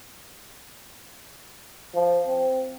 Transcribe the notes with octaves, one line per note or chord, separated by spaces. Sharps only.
F3
C4